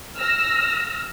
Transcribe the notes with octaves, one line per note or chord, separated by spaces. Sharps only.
E6 F6 A#6